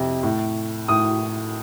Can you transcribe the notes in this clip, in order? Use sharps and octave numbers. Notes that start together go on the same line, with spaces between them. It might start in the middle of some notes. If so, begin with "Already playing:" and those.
Already playing: F2 C3
A2
A2 D#6